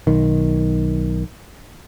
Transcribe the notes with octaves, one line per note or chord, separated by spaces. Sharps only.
B1 D#3